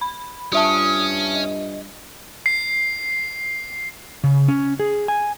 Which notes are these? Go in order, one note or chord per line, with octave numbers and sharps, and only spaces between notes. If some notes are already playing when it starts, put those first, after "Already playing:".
B5
G2 C#4 F4 E5 A5 D#6
D#5
C7
C#3
C#4
G#4
G#5